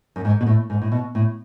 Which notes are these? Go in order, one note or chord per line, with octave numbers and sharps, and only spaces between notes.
F#2
G#2
B2
A2
G#2
A2
B2
A2